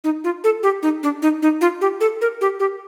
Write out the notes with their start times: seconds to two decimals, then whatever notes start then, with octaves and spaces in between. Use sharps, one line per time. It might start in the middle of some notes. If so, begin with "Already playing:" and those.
0.04 D#4
0.24 F4
0.44 A4
0.63 G4
0.83 D#4
1.03 D4
1.22 D#4
1.42 D#4
1.61 F4
1.81 G4
2.01 A4
2.21 A#4
2.41 G4
2.60 G4